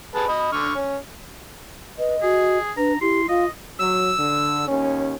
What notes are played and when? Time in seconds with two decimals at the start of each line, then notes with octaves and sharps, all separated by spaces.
0.15 G#4 B4 A5
0.28 D#5 B5
0.52 D3 C#6 F6
0.75 C#4
1.98 B4 D#5
2.22 F#4 G#4
2.77 D4 B4 A#5
3.01 E4 G4 C6
3.29 F4 D#5 F5
3.79 F#3 E6
4.17 D3
4.68 D#2 C#4